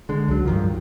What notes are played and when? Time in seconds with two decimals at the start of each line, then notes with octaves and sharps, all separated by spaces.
0.09 D3 G#3
0.28 C#2 F#3
0.46 G2 D#3 F3